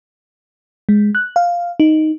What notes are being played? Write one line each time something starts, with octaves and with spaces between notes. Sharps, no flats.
G#3
F#6
F5
D#4